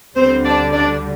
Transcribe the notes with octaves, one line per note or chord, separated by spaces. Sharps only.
D2 D3 G3 C4 C5
D4 D5
D4 D5